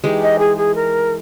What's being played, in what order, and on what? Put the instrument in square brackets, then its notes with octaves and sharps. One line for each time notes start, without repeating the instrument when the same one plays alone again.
[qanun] E3 G#3 D#4 G4
[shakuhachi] D#5
G#4
G#4
A#4